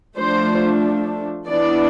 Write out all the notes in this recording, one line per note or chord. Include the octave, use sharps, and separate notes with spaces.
F3 A3 D4 C5
E3 B3 D4 D5